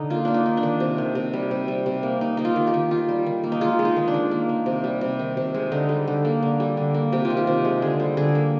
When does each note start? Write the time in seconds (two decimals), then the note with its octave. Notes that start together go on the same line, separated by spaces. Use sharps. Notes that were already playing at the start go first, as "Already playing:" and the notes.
Already playing: D3 D#4
0.10 A#3 F4
0.25 A#3 D4
0.34 D#4
0.46 D#3
0.57 D4
0.63 D#3
0.80 C3
0.98 D#3
1.15 C3
1.33 G3
1.51 C3
1.68 G3
1.86 C3
2.03 A#3
2.21 A#3 D#4
2.37 A#3 D#4
2.45 F4
2.56 D#3
2.67 G4
2.74 D#3
2.91 D#3 F4
3.09 G3
3.27 D#3
3.44 A#3
3.52 D#4
3.61 G#3 F4
3.79 G#3
3.85 D#4
3.96 D#3
4.08 D4
4.14 D#3
4.31 A#3
4.49 D#3
4.66 C3
4.84 G3
5.01 C3
5.19 D#3
5.37 C3
5.54 G#3
5.72 D3 D#4
5.89 G3
6.07 D3
6.25 A#3
6.43 D3
6.60 G3
6.77 D3
6.94 A#3
7.12 C3 G4
7.25 F4
7.30 D#3
7.37 G4
7.47 C3
7.65 G#3
7.82 D3 G#4
8.00 G3
8.17 D3 G#4
8.35 A#3